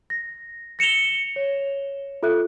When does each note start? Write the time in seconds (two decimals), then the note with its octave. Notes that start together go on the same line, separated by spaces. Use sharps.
0.10 A#6
0.79 A#6 C#7 E7 F7 G7
1.36 C#5
2.23 F4 A4 E5 F#6